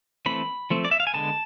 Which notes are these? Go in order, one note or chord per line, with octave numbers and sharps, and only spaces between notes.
E3 A3 C4 B5
F3 A3 C4
D5
E5
F5
G#5
D3 G#3 B3 A5